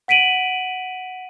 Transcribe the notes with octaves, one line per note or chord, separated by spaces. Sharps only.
F#5 B6 D7 D#7 F#7